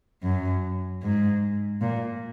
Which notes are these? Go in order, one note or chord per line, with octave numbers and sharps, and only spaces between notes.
F#2
G#2
A#2